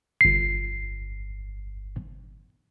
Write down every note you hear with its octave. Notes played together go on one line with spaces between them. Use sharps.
G1 C7